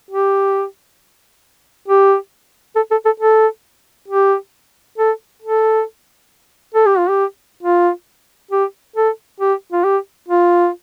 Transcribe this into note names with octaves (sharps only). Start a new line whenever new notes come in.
G4
G4
A4
A4
A4
A4
G4
A4
A4
A4
G4
F4
G4
F4
G4
A4
G4
F4
G4
F4